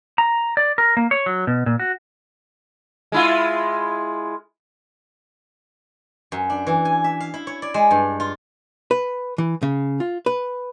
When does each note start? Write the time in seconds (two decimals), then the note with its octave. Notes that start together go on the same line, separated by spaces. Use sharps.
0.18 A#5
0.57 D5
0.78 A#4
0.97 A#3
1.11 C#5
1.26 F#3
1.47 B2
1.66 A#2
1.80 F#4
3.12 G#3 E4 F4
6.32 F#2
6.50 D4
6.67 E3
6.85 G#5
7.04 E5
7.20 F5
7.34 E4
7.47 C#5
7.62 D5
7.74 G#3
7.91 G2
8.20 F4
8.91 B4
9.38 E3
9.63 C#3
10.00 F4
10.26 B4